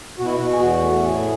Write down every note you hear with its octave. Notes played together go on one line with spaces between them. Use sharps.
B2 F#4
E4
F#4
B2
G#4
E2 F#4
A3
A2 G#4